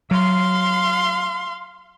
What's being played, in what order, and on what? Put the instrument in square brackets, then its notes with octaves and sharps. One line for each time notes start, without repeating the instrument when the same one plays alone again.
[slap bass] F#3 [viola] F5 C6